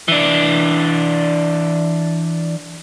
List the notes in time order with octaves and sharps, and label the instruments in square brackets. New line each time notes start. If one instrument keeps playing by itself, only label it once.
[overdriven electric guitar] E3 D4